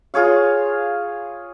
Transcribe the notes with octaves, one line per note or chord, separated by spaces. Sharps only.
F4 G#4 C#5 F5